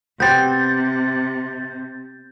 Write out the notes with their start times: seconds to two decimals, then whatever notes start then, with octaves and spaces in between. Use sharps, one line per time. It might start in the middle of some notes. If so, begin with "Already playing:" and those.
0.20 C3 B3 C4 G4 G6 A6